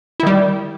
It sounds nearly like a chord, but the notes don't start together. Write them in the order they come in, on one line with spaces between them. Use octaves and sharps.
E4 D#3 G3